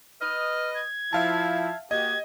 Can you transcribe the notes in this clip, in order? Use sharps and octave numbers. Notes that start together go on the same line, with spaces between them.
B4 D#5 F6
G#6
F3 E4 E5 F5 A5
A#3 F#4 G4 D#5 G#6